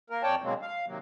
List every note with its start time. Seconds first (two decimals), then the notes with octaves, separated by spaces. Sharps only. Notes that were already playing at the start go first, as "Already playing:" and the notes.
0.10 A#3 A#4
0.23 F2 C#5 D5 G5 A5
0.42 B2 D3 F#3 G#3 A#3 C4
0.62 F5
0.86 C3 D#3 F#3 A#3